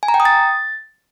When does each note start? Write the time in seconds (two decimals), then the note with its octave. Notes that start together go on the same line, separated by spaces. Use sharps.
0.03 G#5
0.08 A#5
0.14 G5
0.20 D#6
0.25 A6